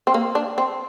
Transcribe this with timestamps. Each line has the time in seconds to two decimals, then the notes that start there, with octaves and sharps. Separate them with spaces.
0.07 C4
0.14 A#3
0.35 D4
0.58 C4